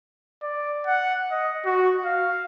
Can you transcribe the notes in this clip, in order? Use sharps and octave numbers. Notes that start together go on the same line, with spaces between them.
D5
F#5
D#5
F#4
F5